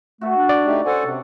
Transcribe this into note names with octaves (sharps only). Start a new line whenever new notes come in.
A3 F#4 A4 B4
D4
D5
A3 D#4 G4
C#4 A4 C5 F#5 G#5
C3 D4